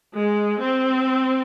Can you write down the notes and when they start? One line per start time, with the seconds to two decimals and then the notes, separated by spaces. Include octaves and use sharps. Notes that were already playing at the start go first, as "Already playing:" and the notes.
0.14 G#3
0.61 C4